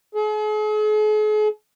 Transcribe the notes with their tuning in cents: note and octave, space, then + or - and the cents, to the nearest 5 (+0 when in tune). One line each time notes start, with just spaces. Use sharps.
G#4 +45